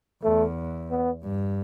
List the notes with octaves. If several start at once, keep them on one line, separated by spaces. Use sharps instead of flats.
E2 A3
B3
G2